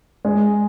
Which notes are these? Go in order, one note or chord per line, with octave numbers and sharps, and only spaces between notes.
G#3